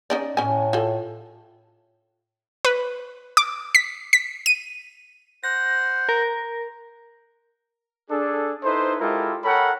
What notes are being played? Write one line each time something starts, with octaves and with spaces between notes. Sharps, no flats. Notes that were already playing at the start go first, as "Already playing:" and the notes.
C#4 D#4 D5
A2 C#4 G#5
F4 A4
B4
D6
B6
B6
D#7
C5 F#5 A#6
A#4
D4 G#4 A4
D#4 E4 A4 B4 C5
G#3 E4 F4 G4 A4 A#4
A4 A#4 C#5 F#5 G5 B5